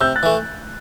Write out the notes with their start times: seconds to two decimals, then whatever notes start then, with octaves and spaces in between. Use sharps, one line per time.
0.01 C3 E6 G6
0.16 F#6 A6
0.23 E3 A3